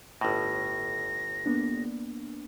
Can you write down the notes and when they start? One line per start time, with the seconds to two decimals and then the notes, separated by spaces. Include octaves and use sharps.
0.21 G1 A2 A#6
1.46 A#3 B3 D4